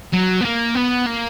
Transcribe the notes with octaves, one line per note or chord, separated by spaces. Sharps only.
F#3
B3
A#3
B3
A#3